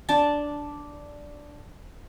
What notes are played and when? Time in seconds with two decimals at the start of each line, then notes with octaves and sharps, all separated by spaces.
0.09 D4 A5